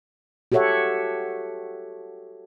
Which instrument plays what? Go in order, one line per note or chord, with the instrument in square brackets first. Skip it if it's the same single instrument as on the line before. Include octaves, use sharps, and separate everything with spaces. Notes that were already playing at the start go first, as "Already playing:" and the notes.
[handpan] F#4 G4 A4 C#5 E5 F#5